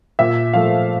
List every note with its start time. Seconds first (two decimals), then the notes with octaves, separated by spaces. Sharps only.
0.19 A#2 E5
0.53 F3 A3 F5